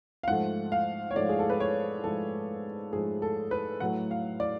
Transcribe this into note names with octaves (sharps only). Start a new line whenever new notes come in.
F5
G#2 F3 A3 F#5
F5
C#5
G#2 F3 A3 D5
G#4
A4
B4
C#5
G#2 F3 A3 A4
G#2 F3 A3 G#4
A4
B4
A2 F#3 A3 F#5
F5
D5